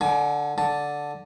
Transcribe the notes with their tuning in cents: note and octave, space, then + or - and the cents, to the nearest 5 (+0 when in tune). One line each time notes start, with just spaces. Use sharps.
D3 +0 G#5 +35
D3 -5 A5 +0